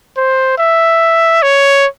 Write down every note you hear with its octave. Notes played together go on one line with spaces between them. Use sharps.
C5
E5
C#5